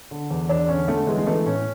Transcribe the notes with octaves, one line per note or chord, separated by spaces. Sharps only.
D3
E2
E2 D4
D3 C#4
D3 A3
E3 G#3
G#3
E3 A3
A2 C#4